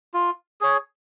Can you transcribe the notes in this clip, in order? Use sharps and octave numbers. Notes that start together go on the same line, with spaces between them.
F4
G#4 C#5